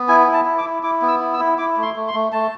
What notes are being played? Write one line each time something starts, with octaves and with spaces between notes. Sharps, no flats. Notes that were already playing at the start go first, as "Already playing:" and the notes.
Already playing: B3
E4 G#5
E4
A5
E4
D6
E4
E4 D6
B3
E6
E4
E6
E4
E4 D6
A3
C6
A3
C6
A3
A3 A5